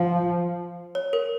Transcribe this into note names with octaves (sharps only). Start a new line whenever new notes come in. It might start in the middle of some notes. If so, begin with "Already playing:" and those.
Already playing: F3 F5
C#5
A#4